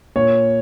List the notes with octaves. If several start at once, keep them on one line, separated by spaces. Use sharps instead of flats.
A#2 C#5